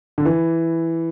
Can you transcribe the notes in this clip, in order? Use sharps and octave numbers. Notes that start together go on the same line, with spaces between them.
D3
E3